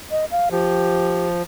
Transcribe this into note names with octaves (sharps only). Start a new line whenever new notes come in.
D#5
F5
F3 G4